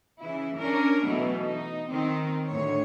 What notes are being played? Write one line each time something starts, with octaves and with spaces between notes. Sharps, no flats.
C#3 E3 E4
C#4 D4 A#4
B2 E3 F#3 A3 B3
D#4
D#3 C4
D2 A2 C#5